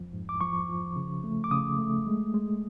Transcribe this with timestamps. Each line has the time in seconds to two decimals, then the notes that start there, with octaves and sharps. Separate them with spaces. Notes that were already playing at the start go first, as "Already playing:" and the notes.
Already playing: F2 F3
0.13 G#2
0.29 D6
0.41 F3 C#6
0.69 F3
0.96 C#3
1.24 A3
1.44 D6
1.51 C#3 D#6
1.79 A3
2.06 G#3
2.34 G#3